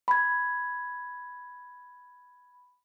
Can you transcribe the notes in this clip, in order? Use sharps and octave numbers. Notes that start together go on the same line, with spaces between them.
B5 G#6